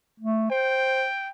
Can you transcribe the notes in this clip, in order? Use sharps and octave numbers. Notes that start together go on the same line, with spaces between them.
A3
C5 G5